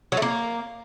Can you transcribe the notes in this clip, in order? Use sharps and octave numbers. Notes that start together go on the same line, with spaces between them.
F#3
A3
A#3